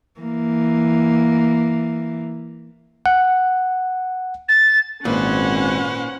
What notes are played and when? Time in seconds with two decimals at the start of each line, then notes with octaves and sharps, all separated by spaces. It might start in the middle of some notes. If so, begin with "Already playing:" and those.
0.20 E3 A#3
3.06 F#5
4.49 A6
5.05 G#1 A#2 C#4 B4 C5 F#5